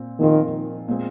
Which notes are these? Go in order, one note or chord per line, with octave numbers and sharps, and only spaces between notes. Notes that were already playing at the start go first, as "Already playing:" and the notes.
Already playing: A#2 C4
A#2 D#3 F3 C4 F4
A#2 G#3 C4